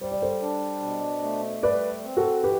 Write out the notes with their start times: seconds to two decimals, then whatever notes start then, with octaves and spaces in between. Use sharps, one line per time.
0.01 G3 C5
0.12 D5
0.22 A4 C5
0.42 D4
0.82 B2
1.22 A3
1.63 G3 B4 D5
2.04 C4
2.17 F#4 A4
2.43 E3 G4 B4